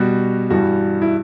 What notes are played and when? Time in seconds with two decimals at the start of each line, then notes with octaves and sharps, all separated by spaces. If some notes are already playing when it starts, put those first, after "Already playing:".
Already playing: B2 G3 F#4
0.50 G2 E3 G3 F#4
1.02 E4